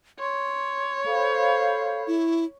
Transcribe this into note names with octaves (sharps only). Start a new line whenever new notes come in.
C#5 C6
A4 C5 F5 B5
E4